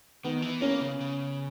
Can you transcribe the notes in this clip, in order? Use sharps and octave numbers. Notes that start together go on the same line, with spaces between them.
D#3 B3
E3
A#3 C#4
C#3
C#3